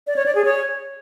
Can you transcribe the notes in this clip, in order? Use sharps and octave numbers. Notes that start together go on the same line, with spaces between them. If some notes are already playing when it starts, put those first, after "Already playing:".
D5
C#5
D5
G#4
C#5